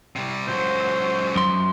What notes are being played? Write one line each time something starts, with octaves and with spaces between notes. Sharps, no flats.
C3 G3
C#2 F#3 C5
F#2 C6